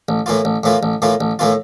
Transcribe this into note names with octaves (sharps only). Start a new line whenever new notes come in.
A1
A2 E3 A#3 F4
A1
A2 E3 A#3 F4
A1
A2 E3 A#3 F4
A1
A2 E3 A#3 F4